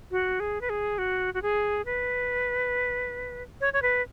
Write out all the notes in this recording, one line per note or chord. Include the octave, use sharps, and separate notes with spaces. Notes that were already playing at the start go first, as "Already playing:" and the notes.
F#4
G#4
B4
G#4
F#4
F#4
G#4
B4
C#5
C#5
B4